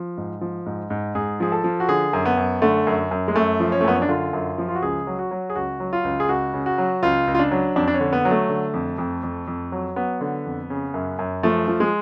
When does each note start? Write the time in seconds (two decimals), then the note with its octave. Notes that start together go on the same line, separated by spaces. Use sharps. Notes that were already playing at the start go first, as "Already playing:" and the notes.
Already playing: F3
0.17 G#2
0.41 F3
0.66 G#2
0.90 G#2
1.15 G#2 G#4
1.40 F3 G#4
1.52 A4
1.64 F3
1.80 F#4
1.89 D3 G#4
2.13 F#2
2.25 B3
2.37 F#2
2.62 D3 A3
2.87 F#2
3.11 F#2
3.28 G#3
3.36 F#2 A3
3.60 F3
3.72 C#4
3.81 A3
3.85 F#2 B3
3.95 C#4
4.02 D4
4.09 D3 F4
4.33 F#2
4.58 F3
4.68 F4
4.75 F#4
4.82 C#2 G#4
5.07 F#3
5.19 F#4
5.31 F#3
5.50 G#4
5.56 C#2 F#4
5.80 F#3
5.93 F4
6.04 C#2
6.20 G#4
6.29 C#2 F#4
6.54 C#3
6.66 F#4
6.78 F#3
7.03 C#2 F4
7.27 C#2
7.35 F4
7.39 D4
7.51 F#3
7.76 F2 D4
7.88 D4
7.94 C#4
8.00 D3
8.13 B3
8.25 F#3
8.31 A3
8.49 D3
8.74 F2
8.98 F2
9.23 F2
9.48 F2
9.72 F#3
9.96 F#3 B3
10.21 D3
10.45 F2
10.70 C#3
10.94 F#2
11.19 F#2
11.43 F3 A3
11.68 F3
11.80 G#3